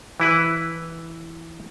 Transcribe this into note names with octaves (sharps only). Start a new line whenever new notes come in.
E3 E4 B4